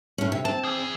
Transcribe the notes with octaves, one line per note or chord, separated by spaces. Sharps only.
A2 C#4
C3
C4 A5
E3 G#4